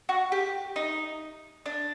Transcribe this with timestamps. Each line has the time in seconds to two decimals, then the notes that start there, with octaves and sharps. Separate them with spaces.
0.09 F#4
0.32 G4
0.76 D#4
1.66 D4